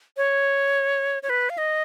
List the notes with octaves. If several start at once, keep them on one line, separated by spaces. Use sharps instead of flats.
C#5
C#5
B4
F5
D#5